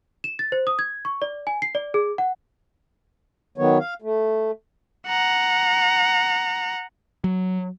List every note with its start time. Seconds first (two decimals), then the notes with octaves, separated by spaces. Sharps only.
0.24 E7
0.39 A6
0.52 C5
0.67 D#6
0.79 G#6
1.05 C#6
1.22 D5
1.47 G#5
1.62 C7
1.75 D5
1.94 G#4
2.18 F#5
3.58 D#3 F#3 B3 C#5
3.79 F5
4.02 A3
5.07 F#5 A#5
7.24 F#3